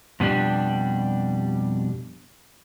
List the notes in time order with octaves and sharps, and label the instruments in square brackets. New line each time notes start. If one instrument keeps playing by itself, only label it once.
[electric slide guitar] F2 B2 G3 D4 G4